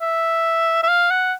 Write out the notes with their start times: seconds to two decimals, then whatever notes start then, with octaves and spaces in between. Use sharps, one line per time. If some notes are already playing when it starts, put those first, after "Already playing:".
0.01 E5
0.83 E5
0.89 F5
1.10 F#5